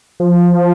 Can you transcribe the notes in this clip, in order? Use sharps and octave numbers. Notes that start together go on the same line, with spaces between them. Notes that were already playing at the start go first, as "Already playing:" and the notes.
F3